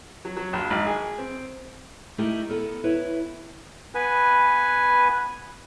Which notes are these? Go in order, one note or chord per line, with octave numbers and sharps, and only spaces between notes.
F#3
F#3
A#1
G#1
G#4
C4
A3 D#4 E4 G4 A#4
B3 A4 A#4
E4 B4 C#5
B3 B4 G#5